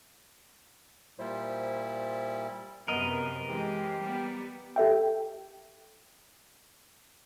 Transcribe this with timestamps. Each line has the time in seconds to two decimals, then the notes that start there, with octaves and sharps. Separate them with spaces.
1.19 A#2 G3 E4 C5
2.88 F#2 C3 B3 A#4 D#5
3.49 E3 G#3 C4 G4
4.01 G3 B3
4.76 G4 A4 E5 G5